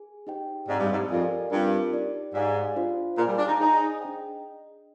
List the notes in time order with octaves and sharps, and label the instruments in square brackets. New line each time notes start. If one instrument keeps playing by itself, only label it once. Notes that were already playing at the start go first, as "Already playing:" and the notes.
Already playing: [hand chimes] G#4 G#5
D#4 G4 C5 D#5 G5
[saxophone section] G#2 [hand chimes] C4 G4 D5
[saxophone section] G2
G#2
[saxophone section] F2 [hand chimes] G4 A#4 D5 F5 G#5
[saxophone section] G2 [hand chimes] C4 F4 A#4
[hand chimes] D#4 G4 D5
[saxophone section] G#2 [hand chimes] G4 D5 F5 G#5
[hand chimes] D4 F4 C5 F5
[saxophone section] A#2 [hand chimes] G#4 D5 F5 G#5
[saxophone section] G3
D4
D#4
[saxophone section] D#4 [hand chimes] G#4 C5 D#5 G#5
[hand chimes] D4 G#4 D#5 G5